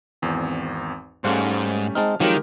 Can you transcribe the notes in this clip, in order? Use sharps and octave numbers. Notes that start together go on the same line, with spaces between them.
G#1 E2 C4
G#2 G3 A3 C#4 C5 F5 F#5
G#3 C4 D#4 A5 F6
D#3 F3 F#3 G#3 C4 G4 A#4